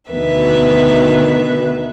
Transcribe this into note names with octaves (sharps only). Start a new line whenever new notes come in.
D2 B2 D#3 B3 B4 E5